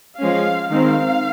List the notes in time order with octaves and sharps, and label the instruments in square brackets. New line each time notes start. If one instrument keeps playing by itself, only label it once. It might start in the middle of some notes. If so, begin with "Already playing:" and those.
[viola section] F3 G#3 C#4 F5
D#3 G#3 C4 F5